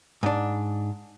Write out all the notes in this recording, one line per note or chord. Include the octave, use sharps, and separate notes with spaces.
G#2 D4